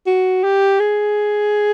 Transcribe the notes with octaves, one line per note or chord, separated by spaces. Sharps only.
F#4
G4
G#4